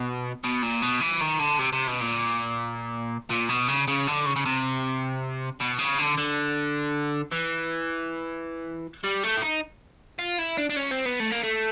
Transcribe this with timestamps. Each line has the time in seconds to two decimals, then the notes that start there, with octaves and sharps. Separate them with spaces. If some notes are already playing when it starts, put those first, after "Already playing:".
Already playing: B2
0.44 B2
0.63 A#2
0.82 B2
1.00 E3
1.20 D#3
1.39 D3
1.59 C3
1.73 C3
1.87 B2
2.01 A#2
3.30 A#2
3.49 B2
3.69 C#3
3.88 C#3
4.07 D3
4.25 C#3
4.36 C#3
4.46 C3
5.60 B2
5.78 C#3
5.99 D3
6.18 D3
7.32 E3
9.04 G3
9.23 A3
9.37 E4
9.42 D#4
10.19 F4
10.39 E4
10.58 D4
10.70 D4
10.76 C#4
10.91 C4
11.05 B3
11.20 A3
11.31 A#3
11.43 A3